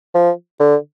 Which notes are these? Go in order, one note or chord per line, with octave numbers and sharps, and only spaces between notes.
F3
D3